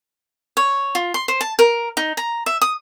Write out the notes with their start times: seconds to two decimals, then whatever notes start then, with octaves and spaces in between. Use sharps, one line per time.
0.57 C#5
0.95 F4
1.14 C6
1.28 C5
1.41 A5
1.59 A#4
1.97 D#4
2.17 A#5
2.46 E5
2.62 D#6